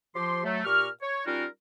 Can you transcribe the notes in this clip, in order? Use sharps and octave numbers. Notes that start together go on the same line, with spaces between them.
F3 G4 C6
F#3 A3
A#2 G4 A#4 C#6 F6
C#5
G3 C#4 D#4 F4 F#4 A#4